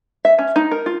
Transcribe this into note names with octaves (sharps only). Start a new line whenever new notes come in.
E5
C#4
D#4
A#4
F4